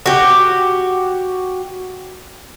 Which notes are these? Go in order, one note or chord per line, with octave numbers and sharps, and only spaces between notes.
F#4 G4